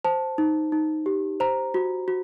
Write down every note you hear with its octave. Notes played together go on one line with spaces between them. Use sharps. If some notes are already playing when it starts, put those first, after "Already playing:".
C5 A5
D#4
D#4
G4
C5 A#5
F#4
F#4